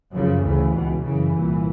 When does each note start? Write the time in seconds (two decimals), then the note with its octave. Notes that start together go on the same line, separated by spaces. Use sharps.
0.12 F#2 C#3 F3
0.42 D2 C#3 E3
0.73 C#2 B2
1.03 F#2 C#3 E3
1.34 C2 A#2